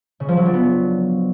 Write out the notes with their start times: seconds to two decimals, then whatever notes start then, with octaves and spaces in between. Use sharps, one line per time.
0.20 C#3
0.29 F3
0.37 F#3
0.45 D4
0.54 B3